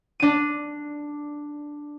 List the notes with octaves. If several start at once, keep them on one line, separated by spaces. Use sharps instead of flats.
D4 D#7